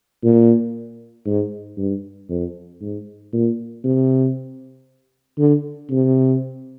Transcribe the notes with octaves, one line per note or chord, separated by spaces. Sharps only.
A#2
G#2
G2
F2
G#2
A#2
C3
D3
C3